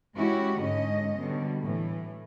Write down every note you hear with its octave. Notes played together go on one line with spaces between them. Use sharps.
G#3 C#4 E4 F#4 G4
G#2 D3 G#3 C#4 D#5
B2 D3 G3
A2 E3 A3